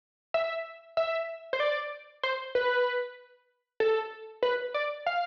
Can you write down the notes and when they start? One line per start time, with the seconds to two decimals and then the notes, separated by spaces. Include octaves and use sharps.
0.34 E5
0.97 E5
1.53 C5
1.60 D5
2.23 C5
2.55 B4
3.80 A4
4.43 B4
4.74 D5
5.06 F5